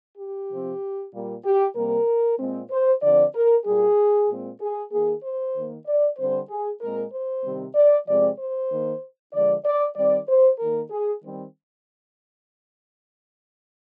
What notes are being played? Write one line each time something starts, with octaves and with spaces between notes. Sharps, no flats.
G4
C3 F3 C4
A#2 G3 A#3
G4
C3 G3 A#3 A#4
A#2 G#3 C4
C5
D3 F3 C4 D5
A#4
A#2 G3 A#3 G#4
A#2 G#3 C4
G#4
D#3 A#3 G#4
C5
D#3 A#3
D5
D3 G3 C4 C5
G#4
A#2 G#3 C4 A#4
C5
C3 D#3 G3 C4
D5
C3 F3 G#3 C4 D5
C5
D#3 A#3
D3 F3 G#3 D5
D5
D#3 G3 C4 D5
C5
D#3 A#3 A#4
G#4
D#3 G3 C4